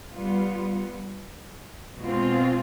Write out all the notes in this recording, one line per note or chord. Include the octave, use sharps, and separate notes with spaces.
G3 B3 F4
B2 G#3 C4 F4